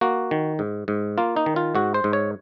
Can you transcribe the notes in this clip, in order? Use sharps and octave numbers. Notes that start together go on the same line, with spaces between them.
A#3 F#4
D#3
G#2
G#2
A#3 F4
D#4
D#3
F4
G#2 F#4
C5
G#2
C#5